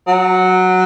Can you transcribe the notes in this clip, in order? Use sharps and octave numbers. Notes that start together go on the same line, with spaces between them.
F#3